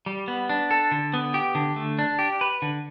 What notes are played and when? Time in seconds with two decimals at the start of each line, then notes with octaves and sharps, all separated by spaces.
0.06 G3
0.28 B3
0.49 D4
0.71 A4
0.91 D3
1.14 B3
1.34 G4
1.55 D3
1.76 A3
1.99 D4
2.19 G4
2.41 B4
2.62 D3